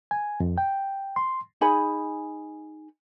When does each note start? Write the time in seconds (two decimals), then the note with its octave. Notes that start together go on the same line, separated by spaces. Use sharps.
0.11 G#5
0.40 F2
0.58 G5
1.16 C6
1.61 D#4 G#4 G#5 B5